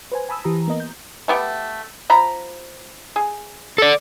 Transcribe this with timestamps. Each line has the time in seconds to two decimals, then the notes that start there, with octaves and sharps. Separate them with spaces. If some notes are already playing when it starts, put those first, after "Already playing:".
0.12 B4 C5 G#5
0.29 G#5 A5 B5 D#6 E6
0.45 E3 G4 A#5
0.68 A#3 B3 D#5 A#5
0.80 G6
1.28 A3 B3 G4
2.10 F3 A#5 B5
3.16 G#4
3.78 A4 D5